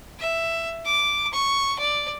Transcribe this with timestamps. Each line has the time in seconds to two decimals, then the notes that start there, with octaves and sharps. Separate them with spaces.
0.20 E5
0.86 D6
1.33 C#6
1.79 D5